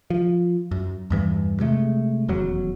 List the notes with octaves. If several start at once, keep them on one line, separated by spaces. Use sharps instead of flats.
F3
F#2
E2 G2 E3
C3 G#3 A3
D#1 E2 F#3